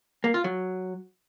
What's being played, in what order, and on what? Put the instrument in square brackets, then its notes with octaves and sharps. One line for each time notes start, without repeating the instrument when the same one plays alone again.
[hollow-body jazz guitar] A#3
F4
F#3